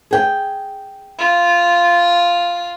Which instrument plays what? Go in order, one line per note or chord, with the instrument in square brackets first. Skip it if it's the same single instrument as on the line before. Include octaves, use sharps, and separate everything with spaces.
[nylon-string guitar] G#4 G5
[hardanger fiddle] F4